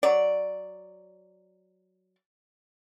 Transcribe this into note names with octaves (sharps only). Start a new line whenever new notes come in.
F#3 D5